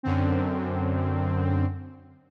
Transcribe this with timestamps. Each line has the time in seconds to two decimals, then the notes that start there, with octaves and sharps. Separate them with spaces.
0.03 F#2 D3 C4